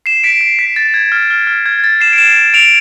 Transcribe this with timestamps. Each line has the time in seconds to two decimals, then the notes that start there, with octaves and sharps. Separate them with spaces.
0.06 C7 E7
0.24 B6 D7
0.41 C7
0.59 B6
0.76 A6
0.94 G#6
1.12 F6
1.30 F6
1.47 F6
1.66 G#6
1.84 A6
2.01 C7 E7
2.13 D7
2.18 C7 E7
2.54 D7 F7